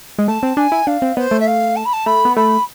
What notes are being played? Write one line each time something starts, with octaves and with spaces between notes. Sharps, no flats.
G#3
A3 A5
C4
D4 G#5
E4
D4 F5
C4
B3 C5
A3
E5
F5
A5
B5
A5
A3 B5
B3
A3 B5